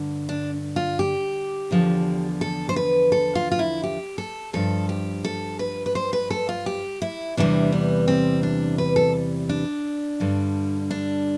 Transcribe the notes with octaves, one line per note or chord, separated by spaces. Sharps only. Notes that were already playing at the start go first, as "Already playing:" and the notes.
Already playing: G2 D3
D4
F4
G4
E2 D3 F3
A4
C5
B4
A4
F4
F4
E4
G4
A4
G2 F3 A4
G4
A4
B4
B4
C5
B4
A4
F4
G4
E4
E2 C3 E3 G3 D4
B3
C4
D4
B4
A4
D4
G2 D3 G3
D4